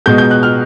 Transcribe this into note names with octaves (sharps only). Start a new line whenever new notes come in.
B2 G#3 G6
G6
F#6
F6